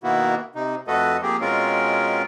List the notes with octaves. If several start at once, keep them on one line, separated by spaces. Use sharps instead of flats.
B2 D#3 A#3 B3 E4 F#4
C3 D#4
F2 A3 F#4 A4 B4 D#5
F3 A#3 C4 G4 G#4
B2 G#3 C4 C#4 F4 A#4